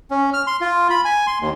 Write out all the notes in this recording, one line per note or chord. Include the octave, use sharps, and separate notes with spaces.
C#4
F6
C6
F4
B5
G#5
C6
D#2